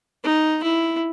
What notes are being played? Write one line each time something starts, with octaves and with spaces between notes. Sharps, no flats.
D#4
E4